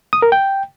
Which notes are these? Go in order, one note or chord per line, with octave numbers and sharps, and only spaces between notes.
D#6
A#4
G5